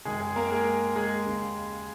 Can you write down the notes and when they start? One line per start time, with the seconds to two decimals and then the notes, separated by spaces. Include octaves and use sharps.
0.05 F#2 D#3 G#3 G#4
0.20 G#3 G#4
0.36 A#3 A#4
0.51 G#3 G#4
0.96 G#3 G#4
1.26 D#2 C#3